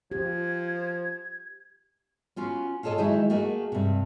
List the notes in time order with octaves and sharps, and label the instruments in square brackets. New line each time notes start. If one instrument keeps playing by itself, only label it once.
[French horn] F3 [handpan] G4 [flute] G#6
[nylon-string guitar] B3 C#4 F4 F#4
F4 G#4 A4 C#5 D#5
D#3 F#3 G#3 D#4 E4
A3 A#3 F#4 G#4
G2 C3